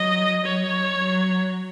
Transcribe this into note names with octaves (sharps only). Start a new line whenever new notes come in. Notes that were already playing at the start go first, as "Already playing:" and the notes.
Already playing: F#3 D#5
F#3 C#5
F#3